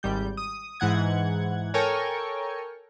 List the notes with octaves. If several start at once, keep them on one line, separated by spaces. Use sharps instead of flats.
G#1 G3 G6
D#6
G#2 E3 F#5 G#6
A4 A#4 C#5 G5 G#5 C#6